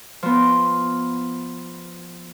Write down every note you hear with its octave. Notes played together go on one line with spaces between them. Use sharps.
F3 B3